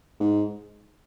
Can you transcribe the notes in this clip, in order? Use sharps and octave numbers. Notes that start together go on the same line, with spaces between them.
G#2